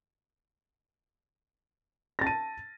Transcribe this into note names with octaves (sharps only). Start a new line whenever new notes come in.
A5 A6 A#6 D#7